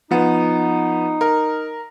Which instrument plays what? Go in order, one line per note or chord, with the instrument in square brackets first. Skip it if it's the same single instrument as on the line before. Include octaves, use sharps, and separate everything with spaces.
[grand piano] F3 B3 [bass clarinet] D#4
[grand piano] A#4